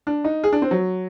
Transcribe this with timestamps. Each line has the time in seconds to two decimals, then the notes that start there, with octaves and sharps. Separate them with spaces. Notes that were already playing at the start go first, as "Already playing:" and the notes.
0.07 D4
0.24 D#4
0.44 G#4
0.52 D4
0.62 C4
0.71 F#3